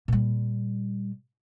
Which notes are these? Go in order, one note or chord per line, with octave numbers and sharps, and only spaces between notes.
A#2 G3